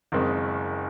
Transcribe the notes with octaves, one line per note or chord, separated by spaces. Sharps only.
F#1 F#2 D#3 G#3 C4